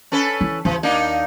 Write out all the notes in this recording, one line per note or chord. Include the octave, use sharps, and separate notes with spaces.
C#4 A4 B4
E3
D#2 E3
A#3 D4 D#4